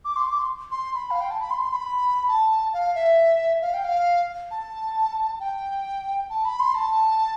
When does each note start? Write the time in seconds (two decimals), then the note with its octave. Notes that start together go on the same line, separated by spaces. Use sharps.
0.05 D6
0.16 C6
0.27 D6
0.38 C6
0.71 C6
0.95 B5
1.11 F5
1.21 G5
1.31 A5
1.41 B5
1.51 C6
1.61 C6
1.73 B5
2.28 A5
2.73 F5
2.95 E5
3.62 F5
3.74 G5
3.85 F5
4.51 A5
5.40 G5
6.30 A5
6.45 B5
6.60 C6
6.74 A5